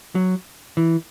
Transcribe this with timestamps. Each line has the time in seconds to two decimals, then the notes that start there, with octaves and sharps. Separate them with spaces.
0.15 F#3
0.77 E3